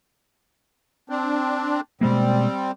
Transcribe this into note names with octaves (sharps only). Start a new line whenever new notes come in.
C4 D4
B2 G3 G#3 A#3 C4